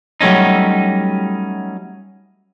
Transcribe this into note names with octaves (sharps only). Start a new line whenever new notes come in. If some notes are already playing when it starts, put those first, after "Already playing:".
F#3 G3 A3 C#4 D#4